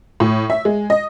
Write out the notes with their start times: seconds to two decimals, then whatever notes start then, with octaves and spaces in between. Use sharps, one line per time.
0.20 A2
0.50 E5
0.65 G#3
0.90 D#5